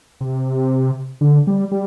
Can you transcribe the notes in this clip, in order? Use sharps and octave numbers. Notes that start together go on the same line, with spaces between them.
C3
D3
G3
G3